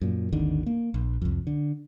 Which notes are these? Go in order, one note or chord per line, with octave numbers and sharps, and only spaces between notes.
F#2 A#2
G#1 D#2 D3 D#3
A#3
A#1
C2 F2
D3